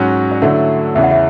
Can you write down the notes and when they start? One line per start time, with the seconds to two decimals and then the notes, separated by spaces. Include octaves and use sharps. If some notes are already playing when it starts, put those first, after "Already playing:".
Already playing: G#2 F#3 C#4 F#4
0.32 D5
0.42 D3 F#3 A3 E4 C#5 E5
0.95 E2 C#3 E3 E5
1.03 F#5
1.11 C#5 E5